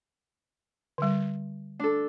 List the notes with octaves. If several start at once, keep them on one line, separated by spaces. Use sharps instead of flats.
D3 G3
D4 A4